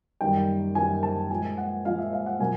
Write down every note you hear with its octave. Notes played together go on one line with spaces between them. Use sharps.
F#2 D#3 G3 A#3 G5
F#2 D#3 G3 A#3 G#5
A5
A#2 F3 G#3 G#5
F#5
A#2 F3 G#3 F5
E5
F5
F#5
B2 F#3 A#3 G#5